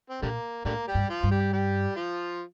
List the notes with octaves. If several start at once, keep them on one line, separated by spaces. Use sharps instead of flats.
C4
A#2 D3 G3 A#3
A2 D3 G3 A#3
G3 G4
G2
F3 F4
G2
G3 G4
G3 G4
F3 F4